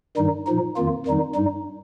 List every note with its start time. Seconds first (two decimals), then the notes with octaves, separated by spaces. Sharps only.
0.17 G2 D#3 G3 D#4
0.47 A#2 F3 D#4
0.76 F2 D#3 A#3 F4
1.06 F2 D#3 G3 D#4
1.35 G2 G3 D#4